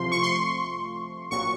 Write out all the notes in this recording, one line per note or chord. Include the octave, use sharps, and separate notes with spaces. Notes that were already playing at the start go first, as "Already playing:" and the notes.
Already playing: C2 C3 F3 A3 C6
C#6
C6
A#1 A#2 F#3 C#6